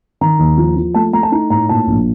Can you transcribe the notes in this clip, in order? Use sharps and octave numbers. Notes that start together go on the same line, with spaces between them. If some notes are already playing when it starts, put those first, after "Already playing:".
D#3 A#5
D#2
F3
F3
A3 A5
A3 A#5
A5
D#4 A#5
A2 A#5
A#2 A5
A#1